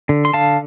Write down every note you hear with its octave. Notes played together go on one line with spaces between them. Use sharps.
D3
C6
D3 F5 A5